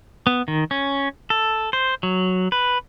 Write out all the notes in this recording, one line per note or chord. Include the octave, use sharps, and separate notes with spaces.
B3
D#3
C#4
A4
C5
F#3
B4